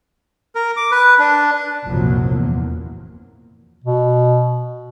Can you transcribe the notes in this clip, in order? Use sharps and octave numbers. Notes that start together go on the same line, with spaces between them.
A#4
D6
B4
D4
F#1 C2 F#2 A#2 F3 F#3
E2 A#2 A#3
B2